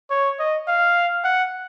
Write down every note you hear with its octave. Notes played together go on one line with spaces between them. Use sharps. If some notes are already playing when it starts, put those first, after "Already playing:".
C#5
D#5
F5
F#5